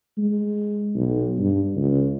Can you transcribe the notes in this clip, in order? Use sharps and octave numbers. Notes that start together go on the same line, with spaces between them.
G#3
B1
G2
C#2